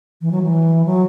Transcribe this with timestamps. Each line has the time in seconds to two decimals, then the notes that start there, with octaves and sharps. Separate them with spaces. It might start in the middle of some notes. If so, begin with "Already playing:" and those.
0.21 E3
0.32 F#3
0.42 E3
0.86 F#3